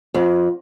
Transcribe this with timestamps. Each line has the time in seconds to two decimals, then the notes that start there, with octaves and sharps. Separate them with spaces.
0.14 F2